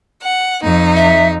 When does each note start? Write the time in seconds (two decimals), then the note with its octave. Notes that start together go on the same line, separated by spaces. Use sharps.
0.22 F#5
0.63 F2 D#4
0.96 E5